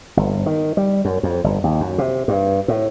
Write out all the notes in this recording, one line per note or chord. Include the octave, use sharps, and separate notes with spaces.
G1
D#3
G3
F#2
F2
G1
D#2
F#2
C3
G2
A2